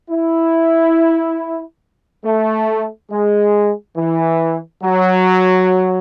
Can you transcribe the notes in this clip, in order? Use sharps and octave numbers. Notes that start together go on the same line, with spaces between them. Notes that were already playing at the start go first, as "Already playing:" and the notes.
E4
A3
G#3
E3
F#3